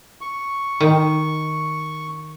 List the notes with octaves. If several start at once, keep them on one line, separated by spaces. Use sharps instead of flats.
C#6
D#3